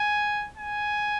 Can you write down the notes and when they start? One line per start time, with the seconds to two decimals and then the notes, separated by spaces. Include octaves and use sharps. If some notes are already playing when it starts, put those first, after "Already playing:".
Already playing: G#5
0.58 G#5